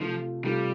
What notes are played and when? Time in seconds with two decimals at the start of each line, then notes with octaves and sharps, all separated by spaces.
0.01 C3 F3 A3 F4
0.44 C3 G3 A3 F4